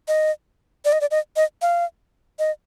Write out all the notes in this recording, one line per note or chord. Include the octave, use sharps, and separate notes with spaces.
D#5
D5
D#5
D5
D#5
D#5
F5
D#5